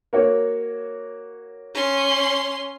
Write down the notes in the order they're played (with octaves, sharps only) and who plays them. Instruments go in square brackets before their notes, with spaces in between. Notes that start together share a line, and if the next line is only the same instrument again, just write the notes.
[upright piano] A#3 F#4 C#5
[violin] C#4 C6